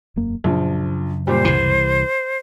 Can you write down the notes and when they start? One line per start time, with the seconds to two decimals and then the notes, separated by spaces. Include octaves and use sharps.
0.16 E1 F#2 A#3
0.44 A#1 F#2 C#3 F3 F#3
1.27 A#2 G3 C5
1.45 C2 E3 C7